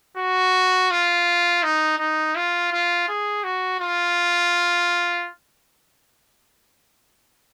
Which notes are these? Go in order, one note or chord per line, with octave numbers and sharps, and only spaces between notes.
F#4
F4
D#4
D#4
F4
F4
G#4
F#4
F4